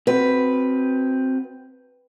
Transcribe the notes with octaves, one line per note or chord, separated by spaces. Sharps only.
C4 F#4 B4